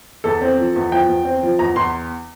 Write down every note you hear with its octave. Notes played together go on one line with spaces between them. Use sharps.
E2 A4
C4
F3
E2
F3 G5
E2
C4
F3
E2 A#5
E2 C6